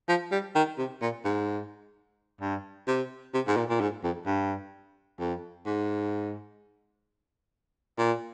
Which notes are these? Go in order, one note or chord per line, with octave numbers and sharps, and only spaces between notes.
F3
G3
D#3
C3
A#2
G#2
G2
C3
C3
G#2
A#2
A#2
G#2
F2
G2
F2
G#2
A#2